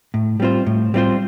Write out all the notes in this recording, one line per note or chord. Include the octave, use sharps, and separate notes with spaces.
A2
G3 C4 F4 C5
A2
G3 C4 F4 C5